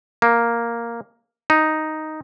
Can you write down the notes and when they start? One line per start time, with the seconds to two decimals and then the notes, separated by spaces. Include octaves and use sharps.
0.22 A#3
1.50 D#4